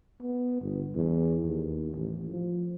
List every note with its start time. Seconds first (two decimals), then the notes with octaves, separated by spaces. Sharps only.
0.22 B3
0.61 G1
0.95 E2
1.44 D#2
1.95 A1
2.31 F3